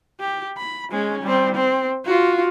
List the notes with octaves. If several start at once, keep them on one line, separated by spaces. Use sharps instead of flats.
G4
B5
G#3 C#4
G3 C4
C4
F4 F#4